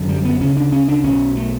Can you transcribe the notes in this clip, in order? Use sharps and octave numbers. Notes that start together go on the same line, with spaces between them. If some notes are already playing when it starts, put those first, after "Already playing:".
Already playing: G1 F#2 D3
G3
B3
D2 C#3 C#4
D4
C#4
D4
B1 B2 C#4
A3